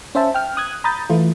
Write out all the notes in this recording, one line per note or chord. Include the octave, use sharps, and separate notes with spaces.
C#4 C5 E5 A5
G5 F6
D#6 F#6 G#6
A#5 B5 D#6 G6 A6
E3 A3 F4